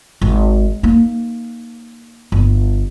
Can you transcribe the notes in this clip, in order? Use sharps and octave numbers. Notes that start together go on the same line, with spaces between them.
G#1
A#3 D#4
G1